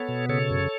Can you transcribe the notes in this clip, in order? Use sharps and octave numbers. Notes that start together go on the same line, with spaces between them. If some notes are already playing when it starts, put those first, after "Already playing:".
Already playing: B3 A4 C#5
B2
C#3 A4 C#5
F#2